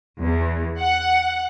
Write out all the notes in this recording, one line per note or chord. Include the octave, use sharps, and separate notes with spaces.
E2
F#5